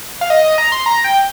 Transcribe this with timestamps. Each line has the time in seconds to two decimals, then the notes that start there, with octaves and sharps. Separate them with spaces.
0.21 F5
0.30 D#5
0.44 D#5
0.58 A#5
0.72 C6
0.86 A#5
1.04 G5